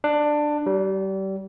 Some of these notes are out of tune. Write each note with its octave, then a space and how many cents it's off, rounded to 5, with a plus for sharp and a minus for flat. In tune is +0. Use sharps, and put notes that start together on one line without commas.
D4 +15
G3 -30